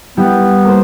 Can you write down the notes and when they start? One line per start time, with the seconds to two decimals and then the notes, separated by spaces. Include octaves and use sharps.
0.17 G3 B3 E4 G4
0.64 A#3 B4 C5